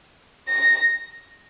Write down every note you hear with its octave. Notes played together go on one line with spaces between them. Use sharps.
A#6